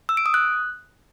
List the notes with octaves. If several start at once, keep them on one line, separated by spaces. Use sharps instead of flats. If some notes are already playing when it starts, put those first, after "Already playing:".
E6
D7
D#6
F#6